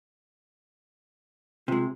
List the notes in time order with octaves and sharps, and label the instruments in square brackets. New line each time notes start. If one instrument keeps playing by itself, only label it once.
[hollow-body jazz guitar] C3 G#3 [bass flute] F4